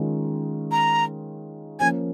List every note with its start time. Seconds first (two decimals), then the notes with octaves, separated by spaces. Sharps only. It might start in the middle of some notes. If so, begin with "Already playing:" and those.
Already playing: D#3 G#3 C#4 F4
0.72 A#5
1.80 F3 A#3 C#4 A#4 G#5